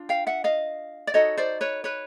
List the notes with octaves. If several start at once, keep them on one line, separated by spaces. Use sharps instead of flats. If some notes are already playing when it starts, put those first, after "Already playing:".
Already playing: D4 F4
F5 G5
E5 F#5
D#5 F5
D5
D#4 F#4 A4 C#5 D#5
C5 D5
B4 C#5
B4 C#5